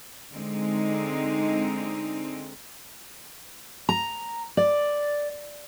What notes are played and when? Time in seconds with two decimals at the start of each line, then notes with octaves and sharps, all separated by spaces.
0.33 D3 G#3 C4 D#4
3.89 A#5
4.57 D5